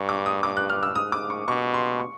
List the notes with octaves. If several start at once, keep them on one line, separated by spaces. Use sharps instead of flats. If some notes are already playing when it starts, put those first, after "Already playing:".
Already playing: G2 C#6
D6
D#6
G2 D6
F#6
F6
E6
G#2 D#6
D6
C#6
B2 C#6
C6
C#6